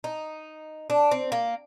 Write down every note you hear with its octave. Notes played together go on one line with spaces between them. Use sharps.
D#4
D4
C4
A#3